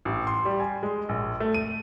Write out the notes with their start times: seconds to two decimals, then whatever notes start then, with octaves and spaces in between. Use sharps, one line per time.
0.05 A1
0.27 C6
0.45 G3
0.60 G#5
0.83 G#3
1.09 A#1
1.40 A3
1.54 D#7